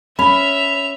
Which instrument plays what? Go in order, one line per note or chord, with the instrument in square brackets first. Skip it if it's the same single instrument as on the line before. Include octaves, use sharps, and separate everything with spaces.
[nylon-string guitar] C#4 [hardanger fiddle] E5 [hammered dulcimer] B5 [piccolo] F7